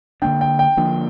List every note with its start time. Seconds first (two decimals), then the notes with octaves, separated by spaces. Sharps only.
0.22 D3 F3 A#3 D4 G5
0.41 G5
0.59 G5
0.77 D3 F3 A#3 D4